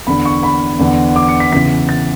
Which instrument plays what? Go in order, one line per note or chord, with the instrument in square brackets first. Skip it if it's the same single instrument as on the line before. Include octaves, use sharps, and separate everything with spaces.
[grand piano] E2 D3 B5
C#6
B5
E2 D3
D6
C#7
B6
E2 C#3 E3 B6
A6